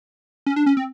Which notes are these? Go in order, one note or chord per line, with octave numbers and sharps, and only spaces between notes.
C#4
D4
C#4
C4